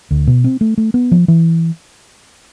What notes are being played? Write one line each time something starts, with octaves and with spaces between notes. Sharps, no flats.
D2
B2
C4
A3
A3
B3
F3
E3